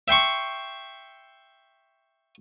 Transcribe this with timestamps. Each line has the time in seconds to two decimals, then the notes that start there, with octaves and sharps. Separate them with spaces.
0.08 E5 G5 C6 C#6